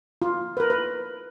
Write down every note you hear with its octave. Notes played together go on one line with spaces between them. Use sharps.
F4
B4
A#4
B4